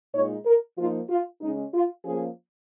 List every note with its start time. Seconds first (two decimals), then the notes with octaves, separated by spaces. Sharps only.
0.14 A#2 G#3 D#4 C#5
0.46 A#4
0.78 F3 A#3 D#4 F4
1.10 F4
1.41 C#3 G#3 C#4 D#4
1.74 F4
2.05 F3 A#3 C#4 G#4